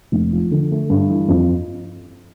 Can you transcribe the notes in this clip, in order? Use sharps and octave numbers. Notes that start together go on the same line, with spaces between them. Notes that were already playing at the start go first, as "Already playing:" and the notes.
F1
F3
D3
A3
G2
E3
F2